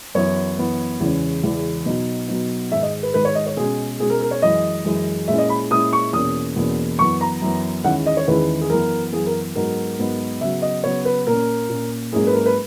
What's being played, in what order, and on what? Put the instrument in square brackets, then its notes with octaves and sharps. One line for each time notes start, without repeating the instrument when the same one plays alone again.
[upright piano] F#2 E3 B3 E4 C#5
F#2 E3 B3 E4
E2 C#3 E3 G#3 C#4
E2 C#3 E3 G#3 C#4
B2 F#3 B3 D#4
B2 F#3 B3 D#4
G#2 D#3 G#3 E5
D#5
B4
G#2 D#3 G#3 B4
C#5
D#5
C#5
B2 G#3 C#4 G#4
B2 G#3 C#4 G#4
A#4
A#4
C#5
F#2 E3 G#3 D#5
F#2 E3 G#3
A#2 G#3 C#4 E4 E5
D#5
B5
A#2 G#3 C#4 E4 D#6
C#6
E2 B2 A#3 C#4 D#6
E2 B2 A#3 C#4
F#2 E3 B3 C#6
A#5
F#2 E3 B3
E2 D#3 G#3 C#4 E4 F#5
D#5
C#5
E2 D#3 G#3 C#4 E4 B4
G#4
F#2 E3 B3 A#4
F#2 E3 B3 G#4
A#4
G#2 F#3 B3 D#4 A#4
G#2 F#3 B3 D#4
C#3 F#3 B3 E5
D#5
C#3 F#3 B3 C#5
B4
A#2 A#3 C#4 A#4
A#2 A#3 C#4
G#2 F#3 A#3 C#4 E4 G#4
B4
A#4
B4